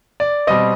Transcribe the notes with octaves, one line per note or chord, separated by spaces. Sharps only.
D5
B2 G3 C4 D#5